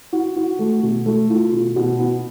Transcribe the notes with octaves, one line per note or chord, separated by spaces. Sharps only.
F#4
F#4
A3
B2
A3
F4
B2
B2
B3